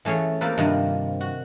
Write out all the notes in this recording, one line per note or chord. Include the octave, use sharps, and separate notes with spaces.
E3 A3 C#4 G#4 C#5
A#3 C4 F4 G4 A4 B4
G2 C3 D#3 F3 D#5
F#4